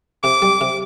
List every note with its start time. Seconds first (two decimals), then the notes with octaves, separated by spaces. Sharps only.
0.23 C3 D6
0.42 G3
0.61 C3